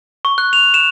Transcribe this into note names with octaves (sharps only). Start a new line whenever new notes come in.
C#6
F#6
F7
E7